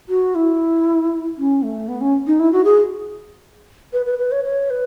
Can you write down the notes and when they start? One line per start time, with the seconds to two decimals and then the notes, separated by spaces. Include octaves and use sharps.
0.09 F#4
0.35 E4
1.38 C#4
1.63 A3
1.88 B3
2.01 C#4
2.27 D#4
2.39 E4
2.52 F#4
2.64 G#4
3.93 B4
4.06 B4
4.19 B4
4.32 C#5
4.44 C#5
4.70 B4